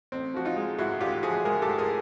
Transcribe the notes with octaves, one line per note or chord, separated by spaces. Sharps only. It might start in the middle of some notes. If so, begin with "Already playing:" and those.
A1 C4
F3 F#4
D#4 F4
G#3
G#2 E4 F#4
A1 F4 G4
F3 F#4 G#4
G#3 G#4 A#4
G4 A4
G#2
G#4 A#4